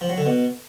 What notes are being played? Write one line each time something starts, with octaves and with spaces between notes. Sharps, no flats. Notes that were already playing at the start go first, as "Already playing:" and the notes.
F3
F#3
D3
B2